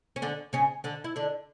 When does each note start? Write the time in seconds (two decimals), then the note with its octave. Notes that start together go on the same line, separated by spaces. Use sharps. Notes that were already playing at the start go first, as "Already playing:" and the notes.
0.16 C#4
0.22 D3 D4
0.53 C#3 C#4
0.84 D3 D4
1.04 E4
1.16 D3 D4